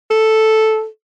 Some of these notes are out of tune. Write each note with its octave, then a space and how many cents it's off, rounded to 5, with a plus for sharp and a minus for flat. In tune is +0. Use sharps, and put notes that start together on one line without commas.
A4 -5